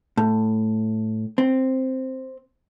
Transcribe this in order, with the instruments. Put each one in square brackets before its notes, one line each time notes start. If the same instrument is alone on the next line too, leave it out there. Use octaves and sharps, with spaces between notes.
[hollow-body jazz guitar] A2
C4